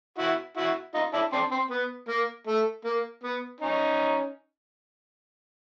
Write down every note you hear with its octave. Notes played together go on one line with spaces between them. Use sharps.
E4 F#4
E4 F#4
D#4 F4
D4 E4
C4 D4
C4
B3
A#3
A3
A#3
B3
C#4 D#4